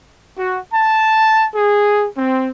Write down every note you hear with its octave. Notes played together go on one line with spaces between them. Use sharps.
F#4
A5
G#4
C4